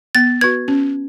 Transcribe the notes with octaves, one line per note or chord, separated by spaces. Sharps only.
B3 A6
F#4 B4 G#6
C#4